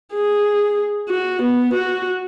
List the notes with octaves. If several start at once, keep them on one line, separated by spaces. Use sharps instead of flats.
G#4
F#4
B3
F#4